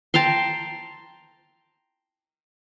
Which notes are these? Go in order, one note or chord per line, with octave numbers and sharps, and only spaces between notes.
G5 A5 A#5 C6